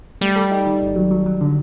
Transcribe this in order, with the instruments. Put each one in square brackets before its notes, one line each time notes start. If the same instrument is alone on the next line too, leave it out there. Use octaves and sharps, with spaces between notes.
[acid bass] G3 [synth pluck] A3
[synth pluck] A4
D#4
D#3
G1
F#3
F#3
F#3
D3